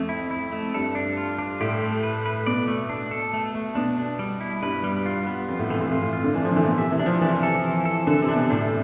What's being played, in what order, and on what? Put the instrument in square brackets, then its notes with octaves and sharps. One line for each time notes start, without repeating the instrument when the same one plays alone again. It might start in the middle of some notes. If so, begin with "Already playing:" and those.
Already playing: [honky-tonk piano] F2 [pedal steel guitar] A3
[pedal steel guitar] E4
E4
A3
[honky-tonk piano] G2 [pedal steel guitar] A4
[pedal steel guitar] D4
F4
D4
[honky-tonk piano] A2 [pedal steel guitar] G4
[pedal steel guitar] A3
B4
B4
[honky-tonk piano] B2 [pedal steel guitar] D5
[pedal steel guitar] A3
D4
A4
A3
A3
[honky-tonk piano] B2 [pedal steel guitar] D4
[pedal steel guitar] D4
G3
E4
[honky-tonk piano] G2 [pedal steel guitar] B4
[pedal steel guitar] G3
F4
B3
[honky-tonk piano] F2 [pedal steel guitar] F4
[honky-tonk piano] A2
[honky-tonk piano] A2 [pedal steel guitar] E3
[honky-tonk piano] A2
[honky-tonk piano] F2 [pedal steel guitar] F4
[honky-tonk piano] A2
[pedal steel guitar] F4
[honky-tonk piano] D3
[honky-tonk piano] E3 [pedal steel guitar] D4
[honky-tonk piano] F3
D3
[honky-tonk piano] E3 [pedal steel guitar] A3
[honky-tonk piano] B2
[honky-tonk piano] C3 [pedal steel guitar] E5
[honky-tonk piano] E3
[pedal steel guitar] D4
[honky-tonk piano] F3
[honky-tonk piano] E3 [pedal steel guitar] D4
[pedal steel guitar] A4
F3
A4
[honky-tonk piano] D3 [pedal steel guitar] A4
[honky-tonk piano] C3
[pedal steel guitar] D4
[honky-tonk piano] B2
[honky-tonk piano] A2 [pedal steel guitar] D4